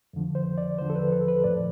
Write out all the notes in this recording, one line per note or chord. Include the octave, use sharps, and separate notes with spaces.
F2 D3 F3
C5
D5
E2 D3 F3 C5
A4
B4
A4
B4
A2 F3 D5